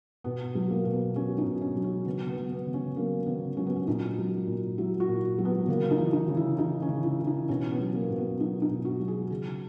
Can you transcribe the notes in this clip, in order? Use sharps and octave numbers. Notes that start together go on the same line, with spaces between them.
B2 B3
F#3
A#3
B2
B3
F#3 C#4
D#4
B2
C#4
F#3
C#4
C#3 B3
B3
F#3
B3
C#3
C#4
F#3 A#3
C#3 B3
F#3 C#4
B3
C#4
A#2 D#4
F#3
A#2
F#3 E4
F#4
A#2
F#3
B3
C#3 A#3
D#4
E3
D#4
C#3
E4
E3 D#4
C#4
C#3
E4
E3
D#4
B2 C#4
B3
F#3
A#3
B2
B3
F#3 D#4
D#4
B2
F#4
F#3
G#4
C#3 G#4